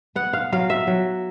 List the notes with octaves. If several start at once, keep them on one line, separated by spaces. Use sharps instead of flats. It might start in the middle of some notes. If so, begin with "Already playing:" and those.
B3 F#5
F5
F#3 F5
E5
F#3